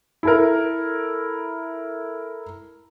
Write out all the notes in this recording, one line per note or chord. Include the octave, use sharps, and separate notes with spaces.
E4 A4 A#4